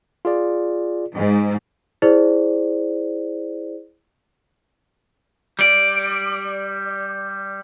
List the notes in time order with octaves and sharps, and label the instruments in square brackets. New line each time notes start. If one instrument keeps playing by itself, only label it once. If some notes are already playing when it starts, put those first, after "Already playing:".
[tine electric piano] F4 G#4 D5
[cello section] G#2
[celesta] E4 G#4 C5 D5
[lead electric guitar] G3 D5